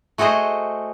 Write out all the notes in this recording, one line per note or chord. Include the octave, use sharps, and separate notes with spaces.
A3 F#4 G#4 C5 D#5